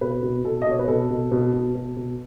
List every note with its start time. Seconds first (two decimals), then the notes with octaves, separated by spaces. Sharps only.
0.01 B2 B4
0.23 B2
0.44 B2 A4
0.62 D#5
0.67 B2 C#5
0.79 B4
0.88 B2 A4
1.10 B2
1.32 B2
1.53 B2
1.75 B2
1.97 B2